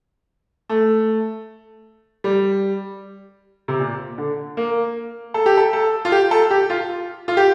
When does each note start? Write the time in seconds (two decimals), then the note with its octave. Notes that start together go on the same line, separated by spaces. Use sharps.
0.69 A3
2.24 G3
3.68 C3
3.79 A#2
4.18 D3
4.57 A#3
5.34 A4
5.46 G4
5.57 A4
5.73 A4
6.05 F4
6.12 G4
6.31 A4
6.50 G4
6.70 F4
7.28 F4
7.37 G4